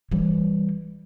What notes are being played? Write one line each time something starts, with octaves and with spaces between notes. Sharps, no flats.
E3 G3